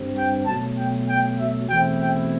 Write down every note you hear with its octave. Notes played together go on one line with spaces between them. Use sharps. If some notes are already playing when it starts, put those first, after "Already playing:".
Already playing: G2 D3 G3 C4
G5
B2 F#3 A3 A5
G5
G5
E5
E2 B2 A3 C4 E4 G5
G5